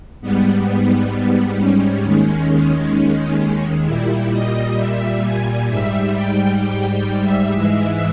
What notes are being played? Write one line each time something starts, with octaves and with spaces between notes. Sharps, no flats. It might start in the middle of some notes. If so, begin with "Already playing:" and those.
G#2 G3 B3
B3
B3
B3
C#4
D#2 D#3 G#3
A#2 G3 E4
D#5
E5
G#5
G#2 G3 E5
G5
G5
G5
E5
G#2 E3 G#3